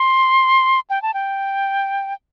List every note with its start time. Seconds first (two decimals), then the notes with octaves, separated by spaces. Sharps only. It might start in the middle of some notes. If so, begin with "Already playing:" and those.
Already playing: C6
0.90 G5
1.02 A5
1.14 G5